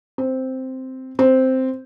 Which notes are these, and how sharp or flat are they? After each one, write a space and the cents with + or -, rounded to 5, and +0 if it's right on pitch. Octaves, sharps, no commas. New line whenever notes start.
C4 -5
C4 -5